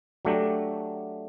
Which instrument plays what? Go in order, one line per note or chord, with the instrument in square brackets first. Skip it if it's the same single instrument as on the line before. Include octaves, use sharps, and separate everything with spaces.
[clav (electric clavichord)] F#3 A3 D4 G4